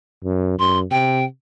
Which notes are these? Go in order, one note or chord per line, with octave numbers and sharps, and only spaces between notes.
F#2
F#2 C6
C3 G5